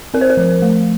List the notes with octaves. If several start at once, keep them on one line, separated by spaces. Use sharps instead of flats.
C4 A#4
C5
A#4
F3
A3